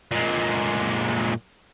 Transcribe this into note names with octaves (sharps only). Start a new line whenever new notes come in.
A#2 G#3